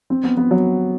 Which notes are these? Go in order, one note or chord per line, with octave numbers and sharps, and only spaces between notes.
C4
B3
B3
F#3